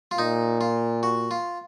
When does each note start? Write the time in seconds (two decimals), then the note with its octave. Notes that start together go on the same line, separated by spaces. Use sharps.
0.11 F4
0.18 A#2 D#4
0.61 F4
1.03 F#4
1.31 F4